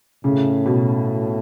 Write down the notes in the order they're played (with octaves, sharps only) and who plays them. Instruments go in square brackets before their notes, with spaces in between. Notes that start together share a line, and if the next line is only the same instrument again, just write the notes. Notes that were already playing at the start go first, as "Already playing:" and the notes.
[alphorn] A2 [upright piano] C#3
[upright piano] B2